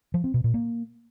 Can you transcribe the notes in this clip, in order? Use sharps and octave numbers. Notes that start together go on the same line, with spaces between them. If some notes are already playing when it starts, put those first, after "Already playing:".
F3
C4
B2
A#2
A#3